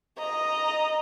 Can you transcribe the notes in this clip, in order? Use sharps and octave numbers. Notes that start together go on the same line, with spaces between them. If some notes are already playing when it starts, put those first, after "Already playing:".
D#5 A#5